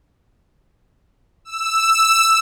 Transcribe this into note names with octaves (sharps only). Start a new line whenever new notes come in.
E6